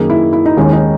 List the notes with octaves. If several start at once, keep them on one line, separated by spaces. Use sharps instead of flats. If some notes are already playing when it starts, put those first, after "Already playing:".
Already playing: F#2 D#3 A#3 G#4
E4
E4
D#4
D#2 D#3 G#3 C#4
D#4